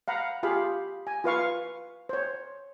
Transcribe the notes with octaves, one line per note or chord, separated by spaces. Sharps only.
F5 F#5 A#5 B5
F4 G4 G#4 F5 B5
G#5
F4 B4 F5 C#6
C5 C#5